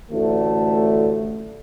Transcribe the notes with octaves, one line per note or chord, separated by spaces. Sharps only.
A1 D2 D3 A3